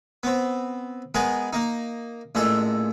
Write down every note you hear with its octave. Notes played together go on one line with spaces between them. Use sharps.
B3 C4
G#3 B3 G#4 A#4
A#3 D#4
A1 A#2 G#3 A4